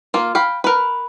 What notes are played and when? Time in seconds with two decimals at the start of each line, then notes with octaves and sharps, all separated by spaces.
0.14 A#3 F4
0.35 F5 G5 B5
0.64 A#4 B4